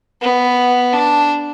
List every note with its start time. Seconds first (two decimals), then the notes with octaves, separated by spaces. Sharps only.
0.21 B3
0.93 D4